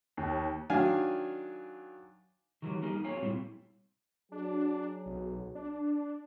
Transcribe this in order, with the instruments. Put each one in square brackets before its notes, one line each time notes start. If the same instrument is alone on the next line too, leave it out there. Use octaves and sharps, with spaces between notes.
[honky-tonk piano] D#2
[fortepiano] D#3 F#3 D4 F5 G#5
[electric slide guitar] D#3 E3 F#3 G3
G3 A#3 D#4 G#4
F#3 C4 G#4 C#5 F5 G#5
A#2 G3 C4 E4
[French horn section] F#3 G#4 [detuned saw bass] D4
[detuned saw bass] B1
D4